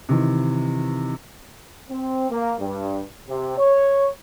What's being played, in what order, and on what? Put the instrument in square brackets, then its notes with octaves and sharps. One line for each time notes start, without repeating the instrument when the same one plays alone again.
[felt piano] C3 D#3 E3
[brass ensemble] C4
A#3
G2
C3
C#5